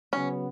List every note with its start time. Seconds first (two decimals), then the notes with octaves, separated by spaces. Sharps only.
0.13 C#3 F#3 B3 C#4